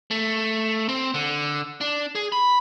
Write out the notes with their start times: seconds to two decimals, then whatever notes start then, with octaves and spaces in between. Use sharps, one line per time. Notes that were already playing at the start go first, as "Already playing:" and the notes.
0.11 A3
0.89 C4
1.14 D3
1.81 D4
2.15 G#4
2.32 B5